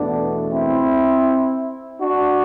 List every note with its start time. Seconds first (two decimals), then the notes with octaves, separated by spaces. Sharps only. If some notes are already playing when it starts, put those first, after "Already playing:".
Already playing: E2 B2 A3 B3 D4
0.51 C4 E4
2.00 D4 F#4